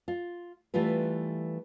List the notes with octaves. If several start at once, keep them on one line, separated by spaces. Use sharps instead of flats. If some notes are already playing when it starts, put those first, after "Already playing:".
F4
E3 G3 A3 F4 B4